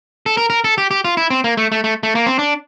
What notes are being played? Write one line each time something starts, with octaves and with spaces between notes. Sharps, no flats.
A4
A#4
A#4
A4
G4
G4
F4
E4
C4
A#3
A3
A3
A3
A3
A#3
C4
D4